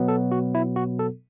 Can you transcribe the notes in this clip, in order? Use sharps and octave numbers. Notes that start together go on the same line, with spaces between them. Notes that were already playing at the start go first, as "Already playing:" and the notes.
Already playing: B2 F#3 B3
A4
F#4
E4
F#4
A4